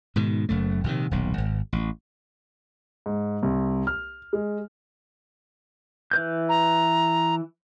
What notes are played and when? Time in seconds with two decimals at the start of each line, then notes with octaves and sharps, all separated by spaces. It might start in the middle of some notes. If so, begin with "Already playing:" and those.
0.16 G#2 B2 D#3
0.49 F#1 F#2 A3
0.84 A#1 C3 D#3
1.11 D#1 B1
1.38 G#1
1.73 A1
3.06 G#2
3.43 C2
3.87 F6
4.33 G#3
6.11 E3 B4 G6
6.49 A#5